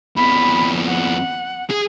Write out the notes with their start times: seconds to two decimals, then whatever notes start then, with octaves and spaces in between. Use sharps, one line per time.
0.17 F2 B3 B5
0.86 F#5
1.71 G#4